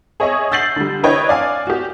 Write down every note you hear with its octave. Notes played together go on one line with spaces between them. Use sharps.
G#4 C#5 D#5 E5 C#6
E6 G6 A6 C7 F#7
D3 G3
D4 E4 B4 C#5 D#5 G5
D5 F5 G#5
F#4 G4